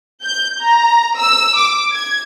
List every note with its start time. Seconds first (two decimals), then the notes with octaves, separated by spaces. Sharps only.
0.25 G6
0.61 A#5
1.18 E6
1.58 D6
1.92 G#6